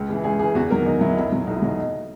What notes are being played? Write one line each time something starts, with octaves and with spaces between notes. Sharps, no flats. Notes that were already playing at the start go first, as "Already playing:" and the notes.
Already playing: C#2
C#3 E3
C#2 G#4
C#3 E3 G#4
E2 F#4
D#3 F#3 A#4
E2 D#4
D#3 F#3 E4
B1 E4
B2 F#3
B1 D#4
E4
B2 F#3 D#4